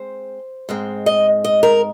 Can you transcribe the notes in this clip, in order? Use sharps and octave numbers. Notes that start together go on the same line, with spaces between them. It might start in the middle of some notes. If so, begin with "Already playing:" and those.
Already playing: G#3 C4 C5
G#2 G#3 C4
D#5
D#5
A#4